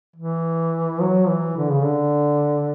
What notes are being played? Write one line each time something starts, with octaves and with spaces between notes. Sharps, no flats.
E3
F#3
E3
D3
C#3
D3